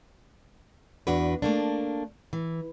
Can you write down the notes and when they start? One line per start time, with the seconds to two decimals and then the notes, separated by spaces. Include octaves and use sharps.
1.07 E2 D4 F#4 B4
1.42 A3 A#3 D4
2.33 E3